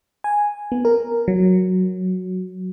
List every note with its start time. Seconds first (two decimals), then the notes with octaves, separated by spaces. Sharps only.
0.24 G#5
0.72 B3
0.85 A#4
1.28 F#3